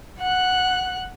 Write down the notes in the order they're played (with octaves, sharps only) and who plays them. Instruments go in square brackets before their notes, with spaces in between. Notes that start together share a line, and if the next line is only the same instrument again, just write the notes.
[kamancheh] F#5 F#6